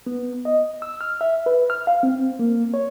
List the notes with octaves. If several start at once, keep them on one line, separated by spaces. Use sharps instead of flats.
B3
D#5
E6
F6
E5
B4
F6
F5
C4
A#3
C#5